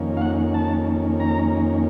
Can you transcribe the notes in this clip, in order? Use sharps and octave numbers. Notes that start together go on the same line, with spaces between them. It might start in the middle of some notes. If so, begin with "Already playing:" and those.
Already playing: F2 D#3 A#3 C#4
F5
F#5
A5
A#5